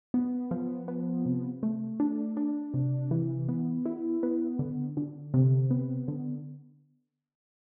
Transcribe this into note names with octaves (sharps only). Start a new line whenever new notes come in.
B3
F3
B3
C3
A3
D4
D4
C3
E3
B3
E4
B3
D3
D3
C3
B3
D3